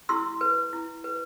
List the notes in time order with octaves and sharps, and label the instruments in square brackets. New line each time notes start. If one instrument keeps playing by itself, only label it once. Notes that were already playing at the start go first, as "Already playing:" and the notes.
[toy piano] E4 C6 E6
B4
E4
B4